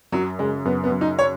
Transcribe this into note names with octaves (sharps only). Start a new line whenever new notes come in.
F#2 F#3
C#3 G#3
F#2 B3
B3
F#2
D#4
C#5